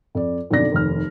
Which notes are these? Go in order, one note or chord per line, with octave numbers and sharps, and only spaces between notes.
F2 D5
B1 F2 D3 D5 A#6
F1 D#2 F6